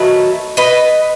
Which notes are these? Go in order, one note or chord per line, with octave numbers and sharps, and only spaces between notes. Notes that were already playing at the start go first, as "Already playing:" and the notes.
Already playing: D#3 F#3 A3 B4 D#5
B4 D#5